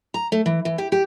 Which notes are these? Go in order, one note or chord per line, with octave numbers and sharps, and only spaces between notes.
A#5
A3
E3
E3
G4
G4